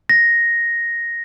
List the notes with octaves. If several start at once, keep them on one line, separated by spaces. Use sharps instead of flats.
A#6